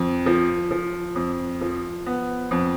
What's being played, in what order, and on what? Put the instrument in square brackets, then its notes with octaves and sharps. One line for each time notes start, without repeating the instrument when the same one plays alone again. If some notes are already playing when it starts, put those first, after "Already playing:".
Already playing: [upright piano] F2
F3
F3
F2
F3
B3
F2